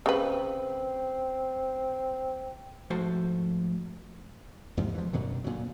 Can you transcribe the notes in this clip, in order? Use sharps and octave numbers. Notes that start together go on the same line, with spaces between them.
C#3 C4 B4
G#2 F3 A3 F#4 C5 A5
E2 G#2 C3 F3
E3 F3
F#2 B2 D3 D#3
D2 A#2 F#3